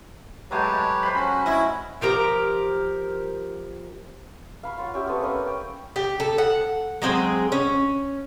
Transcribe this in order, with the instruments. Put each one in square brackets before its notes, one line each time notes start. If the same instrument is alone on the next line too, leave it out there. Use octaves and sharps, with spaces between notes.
[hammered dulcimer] F#3 G#3 A3 [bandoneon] G4 B4 C#5
[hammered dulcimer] C5 B5
[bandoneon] C#4 F#4 [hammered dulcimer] B5
[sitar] E4 [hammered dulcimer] D#5
[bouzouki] F3 G4 A#4 A#5
[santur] F5 B5 C#6
F4 C#5 F#5
C#4 G4 E5
B3 C4 A4 B4
A#3 C#4 B4 D#6
G5
[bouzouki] G4
A4
F#5
F#3 G#3 C4 G#4
C#4